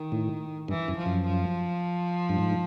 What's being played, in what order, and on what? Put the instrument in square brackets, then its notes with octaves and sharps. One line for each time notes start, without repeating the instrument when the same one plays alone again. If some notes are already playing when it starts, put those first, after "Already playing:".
Already playing: [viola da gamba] D#3
[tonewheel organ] A2
[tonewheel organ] G2 [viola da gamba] E3
[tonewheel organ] F#2
[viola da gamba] F3
[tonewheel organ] F#2
[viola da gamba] F3
[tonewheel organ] G2
G#2